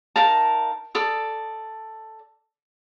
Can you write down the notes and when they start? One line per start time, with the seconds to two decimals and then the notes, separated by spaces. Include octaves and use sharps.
0.16 D#4 A#4 F5 A5
0.95 A4 D5 D#6